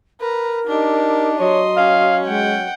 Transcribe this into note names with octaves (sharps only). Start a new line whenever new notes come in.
A#4 B4 A#5
D4 D#4 G4
F#3 C#5 D#5 C6
C#4 F5
G#3 F#5 G5